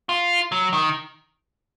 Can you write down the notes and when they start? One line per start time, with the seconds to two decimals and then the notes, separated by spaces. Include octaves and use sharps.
0.09 F4
0.52 F#3
0.73 D#3